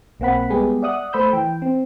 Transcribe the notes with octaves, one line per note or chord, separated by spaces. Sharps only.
B1 A#3 C4 F#5 B5
G3 G#3 B3 G4 G#4
D5 E5 F#5 D#6 F#6
A3 C5 B5 E6 G6
E3 G5
C4